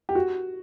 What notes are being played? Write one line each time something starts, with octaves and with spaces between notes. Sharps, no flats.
G4
F#4